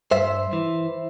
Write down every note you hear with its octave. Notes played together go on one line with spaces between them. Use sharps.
G2 C5 E5
E3